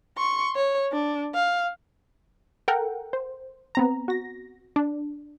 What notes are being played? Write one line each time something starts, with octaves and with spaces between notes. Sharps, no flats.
C6 C#6
C#5
D4
F5
A4 A#4 F#5 G5
C5
B3 C4 A#5
F#4 A#6
D4